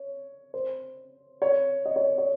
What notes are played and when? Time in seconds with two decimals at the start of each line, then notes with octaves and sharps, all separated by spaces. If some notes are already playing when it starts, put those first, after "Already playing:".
Already playing: C#5
0.54 C5
1.42 C#5
1.86 D#5
1.96 C#5
2.18 C#5